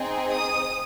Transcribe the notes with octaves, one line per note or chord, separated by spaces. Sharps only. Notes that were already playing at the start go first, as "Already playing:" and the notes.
Already playing: C4 D#4 G#4
D#6